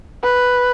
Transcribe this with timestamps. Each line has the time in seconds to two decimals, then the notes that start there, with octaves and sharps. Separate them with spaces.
0.23 B4